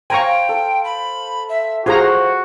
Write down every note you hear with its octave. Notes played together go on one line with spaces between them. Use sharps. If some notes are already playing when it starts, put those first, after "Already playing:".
C5 F5 G5 G#5 A#5 C#6
A4
B5
E5
F4 F#4 G#4 C5 A#5